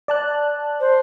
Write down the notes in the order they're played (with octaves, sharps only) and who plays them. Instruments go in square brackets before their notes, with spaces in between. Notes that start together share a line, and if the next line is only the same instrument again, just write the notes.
[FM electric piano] D5 A5 F#6
[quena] C5